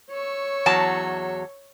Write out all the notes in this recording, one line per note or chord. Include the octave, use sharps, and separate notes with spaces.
C#5 C#6 E6
E2 F#3 A5